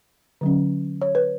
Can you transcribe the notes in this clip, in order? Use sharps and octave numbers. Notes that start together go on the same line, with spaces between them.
D3 F#3 C#4
C#5
B4